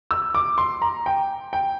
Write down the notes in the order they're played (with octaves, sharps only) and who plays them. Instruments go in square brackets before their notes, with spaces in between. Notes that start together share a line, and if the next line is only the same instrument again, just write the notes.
[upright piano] E6
D6
C6
A#5
G5
G5